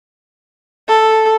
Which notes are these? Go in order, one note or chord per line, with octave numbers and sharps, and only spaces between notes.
A4